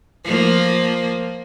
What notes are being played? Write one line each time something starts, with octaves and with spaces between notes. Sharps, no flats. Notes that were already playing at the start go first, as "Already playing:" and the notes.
F3 A#3